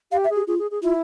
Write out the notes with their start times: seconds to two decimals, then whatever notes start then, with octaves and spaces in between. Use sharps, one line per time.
0.12 G4 F5
0.24 E5
0.30 G#4
0.36 G4
0.47 F4 G#4
0.59 G#4
0.71 G#4
0.82 E4 F4